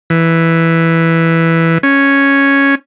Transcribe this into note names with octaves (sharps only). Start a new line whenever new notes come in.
E3
C#4